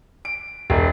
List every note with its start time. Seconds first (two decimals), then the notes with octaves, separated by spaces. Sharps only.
0.25 D7
0.70 E1